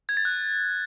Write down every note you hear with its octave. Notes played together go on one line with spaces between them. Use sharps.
G#6
A6
F#6